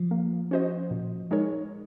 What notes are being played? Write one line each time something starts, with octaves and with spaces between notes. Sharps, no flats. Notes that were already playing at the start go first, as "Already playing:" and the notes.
Already playing: F3
A#3
C#4 F#4 C5 D#5
A#2
G#3 D#4 A#4 C#5